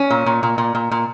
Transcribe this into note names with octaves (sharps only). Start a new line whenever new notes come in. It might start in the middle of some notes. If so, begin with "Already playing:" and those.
Already playing: C#4
A#2
A#2
A#2
A#2
A#2
A#2